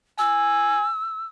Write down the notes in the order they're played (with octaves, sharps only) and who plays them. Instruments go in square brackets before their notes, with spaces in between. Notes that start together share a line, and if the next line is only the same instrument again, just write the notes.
[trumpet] G#5 [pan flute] E6